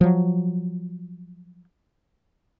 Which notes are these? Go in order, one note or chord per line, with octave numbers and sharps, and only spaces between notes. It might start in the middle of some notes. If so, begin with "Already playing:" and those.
F3 F#3